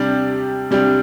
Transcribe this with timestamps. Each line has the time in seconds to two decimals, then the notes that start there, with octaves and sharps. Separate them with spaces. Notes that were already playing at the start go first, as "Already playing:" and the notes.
Already playing: C3 G3 D4 G4
0.71 C3 G3 D4 G4